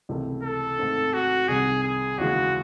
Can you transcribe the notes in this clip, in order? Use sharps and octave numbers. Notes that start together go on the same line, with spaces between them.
C#2 C3 E3 A3
A4
G#2 D#3 A3 C4 D#4
F#4
C2 C3 D#3 G#4
G#4
D#2 C#3 E3 G#3 F#4